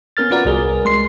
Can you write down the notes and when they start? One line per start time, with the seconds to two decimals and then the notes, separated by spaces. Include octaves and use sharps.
0.17 B3 C#4 A#4 F6 A6
0.31 F4 F#4 B4 D5 F#5 A#5
0.45 C2 G#4 A#4
0.85 G#3 C6 C7